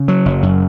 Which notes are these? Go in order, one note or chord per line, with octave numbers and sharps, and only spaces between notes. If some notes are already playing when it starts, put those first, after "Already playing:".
Already playing: C#3
F#3
F#1
F#2